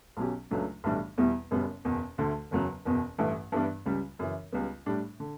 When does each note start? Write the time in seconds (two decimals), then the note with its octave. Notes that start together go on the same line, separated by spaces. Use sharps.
0.17 B1 B2 F#3 C#4 G4
0.51 C#2 C#3 F#3 A3 D4
0.84 B1 A2 E3 G3 D4
1.18 E2 B2 G3 B3 E4
1.51 F#1 F#2 C#3 G3 B3
1.85 F#1 E2 B2
2.18 D2 D3 A3
2.51 F#1 E2 C#3 F#3 B3
2.85 F#1 E2 B2
3.18 A1 G2 E3 A3
3.52 G2 E3 G3 B3 D4
3.86 C#2 C#3 G3
4.19 F#2 C#3 E3
4.52 C#2 C#3 G3 B3
4.86 A2 G3 D4 G4
5.20 D3